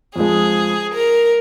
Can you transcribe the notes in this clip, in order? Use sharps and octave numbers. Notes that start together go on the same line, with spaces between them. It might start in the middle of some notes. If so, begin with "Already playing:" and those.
F2 F3 G#3 G#4
A#4